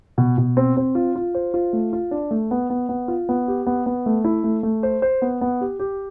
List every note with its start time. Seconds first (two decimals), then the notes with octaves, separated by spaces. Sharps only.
0.18 B2
0.38 B2
0.57 C4
0.77 C4
0.95 F4
1.16 F4
1.35 C5
1.54 F4
1.73 A3
1.93 F4
2.11 D4
2.31 A3
2.51 B3
2.70 B3
2.89 B3
3.08 F4
3.29 B3
3.48 G4
3.67 B3
3.86 B3
4.06 A3
4.24 E4
4.44 A3
4.63 A3
4.83 C5
5.02 C5
5.22 B3
5.41 B3
5.61 G4
5.79 G4